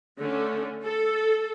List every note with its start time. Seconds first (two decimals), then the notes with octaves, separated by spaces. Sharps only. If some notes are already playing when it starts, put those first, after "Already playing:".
0.21 D3 A3 C#4
0.84 A4